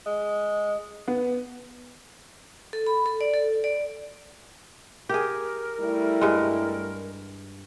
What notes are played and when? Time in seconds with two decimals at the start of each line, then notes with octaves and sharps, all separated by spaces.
0.06 G#3
1.08 B3
2.73 A4
2.87 B5
3.06 A4
3.21 D5
3.34 A4
3.64 D5
5.09 G4 G#4 A#4
5.81 G3 A3 E4
6.21 G2 G#3